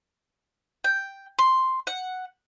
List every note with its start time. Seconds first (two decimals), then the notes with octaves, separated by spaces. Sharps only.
0.84 G5
1.39 C6
1.87 F#5